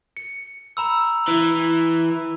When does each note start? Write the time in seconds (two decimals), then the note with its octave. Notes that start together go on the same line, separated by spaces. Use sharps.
0.17 C#7
0.77 A#5 B5 E6
1.28 E3